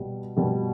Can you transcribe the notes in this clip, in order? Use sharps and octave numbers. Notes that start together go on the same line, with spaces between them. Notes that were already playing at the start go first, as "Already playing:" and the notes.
Already playing: B2 G3
B2 G3